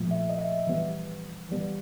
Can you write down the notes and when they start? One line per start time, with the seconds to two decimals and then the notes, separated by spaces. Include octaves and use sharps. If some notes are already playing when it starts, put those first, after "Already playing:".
Already playing: A#2 F3 A3
0.11 E5
0.29 D#5
0.39 E5
0.67 E3 G3 B3
1.49 E3 G3 B3